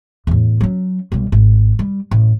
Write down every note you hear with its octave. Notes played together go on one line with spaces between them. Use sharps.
E2 A2
F#3 C#4
B1 G3
G#1
G3
A1